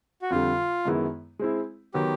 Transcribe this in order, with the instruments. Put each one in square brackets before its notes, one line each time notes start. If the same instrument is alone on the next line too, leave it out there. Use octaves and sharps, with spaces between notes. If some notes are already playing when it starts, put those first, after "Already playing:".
[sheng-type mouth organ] F#4
[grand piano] F2 D3 G3 [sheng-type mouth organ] F4
[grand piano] F#2 D#3 G#3 B3 E4
G#3 C4 E4
[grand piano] D#3 F#3 B3 [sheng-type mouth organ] G4